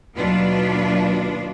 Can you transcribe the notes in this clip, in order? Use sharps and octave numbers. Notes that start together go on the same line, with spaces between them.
D#2 B2 F#3 D4 F4 B4